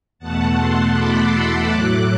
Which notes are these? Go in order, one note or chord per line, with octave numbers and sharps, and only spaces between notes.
E2 B2 A3 F#5 A5
A5 C6
B5 D6
C6 E6
A2 F#3 A3 D6 F#6